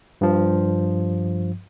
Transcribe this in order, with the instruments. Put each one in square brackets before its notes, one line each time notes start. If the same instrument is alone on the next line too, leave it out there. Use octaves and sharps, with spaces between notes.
[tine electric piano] G2 F3